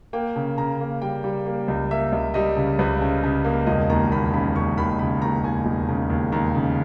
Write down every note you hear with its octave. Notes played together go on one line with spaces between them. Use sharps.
A#3 G5
C#3
C#3 A#5
A#3
G3 G5
G3
A#3
C#2
A#3 E5
C#2
G3 D#5
C#3
C#2 B4
C#3
C#3
A#3
E1 D#5
D#2 A#5
D#2 B5
C#3 B5
D#2 C#6
D#2 B5
C#3 B5
D#2 A#5
D#2 G#5
E1
C#3
D#2
D#2 A#5
C#3